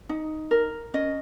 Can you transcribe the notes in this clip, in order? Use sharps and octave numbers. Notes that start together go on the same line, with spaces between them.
D#4
A#4
C#4 D#5